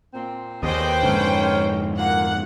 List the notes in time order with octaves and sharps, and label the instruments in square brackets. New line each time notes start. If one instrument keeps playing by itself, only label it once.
[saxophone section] A#2 C4
[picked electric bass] D#2 [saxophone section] G#4 D5 D#5 [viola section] B4 C5 G5
[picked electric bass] F2 G#2 D3 [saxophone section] A#3 C#4
[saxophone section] A#2 A#3 [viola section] F#5